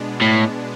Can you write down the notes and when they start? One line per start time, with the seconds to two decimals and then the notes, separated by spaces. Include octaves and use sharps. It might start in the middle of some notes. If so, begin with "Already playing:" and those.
Already playing: B2 G#3 B3 D4
0.21 A2